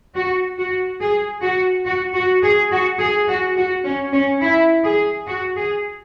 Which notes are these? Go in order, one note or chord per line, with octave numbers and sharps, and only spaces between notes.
F#4
F#4
G#4
F#4
F#4
F#4
G#4
F#4
G#4
F#4
F#4
C#4
C#4
E4
G#4
F#4
G#4